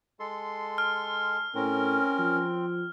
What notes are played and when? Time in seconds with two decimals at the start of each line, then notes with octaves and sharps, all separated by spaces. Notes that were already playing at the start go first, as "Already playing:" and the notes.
0.20 G#3 A4 C6
0.78 F6
1.55 A2 C4 C#4 A#4
2.19 F3